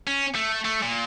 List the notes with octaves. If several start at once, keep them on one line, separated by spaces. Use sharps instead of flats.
C#4
A3
A3
A#2